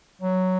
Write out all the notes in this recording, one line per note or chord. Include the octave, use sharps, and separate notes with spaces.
F#3